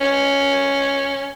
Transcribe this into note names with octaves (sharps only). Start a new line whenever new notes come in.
C#4